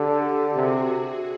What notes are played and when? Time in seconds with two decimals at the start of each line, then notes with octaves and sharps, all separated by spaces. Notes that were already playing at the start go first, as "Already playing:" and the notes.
Already playing: D3 G4 A4
0.56 C3 F#4 G#4